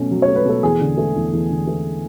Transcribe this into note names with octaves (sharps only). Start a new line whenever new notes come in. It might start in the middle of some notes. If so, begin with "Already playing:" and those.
Already playing: B2 F#3 A3 C#4
F#3
C#5
A3
B4
B2 A4
E2 G#4
D3
A3
E2
E2
D3
A3